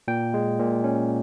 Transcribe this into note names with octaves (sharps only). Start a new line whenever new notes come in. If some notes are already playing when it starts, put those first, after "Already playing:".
A#2 G5
G#3
A#2
C#4